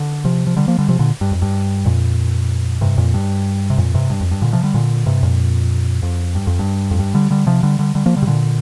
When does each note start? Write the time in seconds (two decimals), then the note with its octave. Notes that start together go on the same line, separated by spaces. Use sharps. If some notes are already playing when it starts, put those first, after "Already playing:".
Already playing: D3
0.25 C3 F3
0.47 F3
0.57 D3 G3
0.68 F3 A#3
0.78 D3 G3
0.89 C3 F3
0.99 A#2 D3
1.21 G2
1.32 F2
1.42 G2
1.85 F2 A#2
2.81 G2 C3
2.97 F2 A#2
3.14 G2
3.70 C3
3.78 F2 A#2
3.94 G2 C3
4.10 G2
4.21 F2
4.31 G2
4.42 A#2 D3
4.53 C3 F3
4.63 D3 G3
4.74 A#2 D3
5.06 G2 C3
5.23 F2 A#2
6.03 F2
6.35 G2
6.47 F2
6.59 G2
6.91 F2
6.99 G2
7.15 D3 G3
7.31 D3 G3
7.47 C3 F3
7.63 D3 G3
7.79 D3 G3
7.95 D3 G3
8.06 F3 A#3
8.16 D3 G3
8.22 C3
8.27 A#2 D3